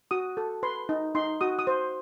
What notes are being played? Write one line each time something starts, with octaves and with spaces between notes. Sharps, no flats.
F#4 D#6
A4
B4 C6
D#4
D#4 C6
F#4 D#6
D#6
C5